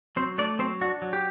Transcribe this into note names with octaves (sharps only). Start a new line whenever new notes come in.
F#3 C4 C5
A3 D4 D5
F#3 C4 C5
D4 F#4
F#3
G4